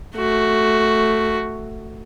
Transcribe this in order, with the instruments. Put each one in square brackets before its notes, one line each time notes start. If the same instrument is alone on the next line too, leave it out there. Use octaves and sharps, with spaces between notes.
[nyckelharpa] A3 F#4